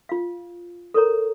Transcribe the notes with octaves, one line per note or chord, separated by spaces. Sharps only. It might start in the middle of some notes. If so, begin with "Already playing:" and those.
F4 F5
A4 A#4 C#5 A#5